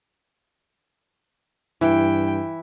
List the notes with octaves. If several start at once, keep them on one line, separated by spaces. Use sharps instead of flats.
G2 E3 E4 G5